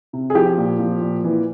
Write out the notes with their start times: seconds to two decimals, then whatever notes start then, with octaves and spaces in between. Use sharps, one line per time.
0.13 C3
0.30 G#4
0.35 F3 G4
0.57 A#2
0.79 F3
1.01 A#2
1.24 E3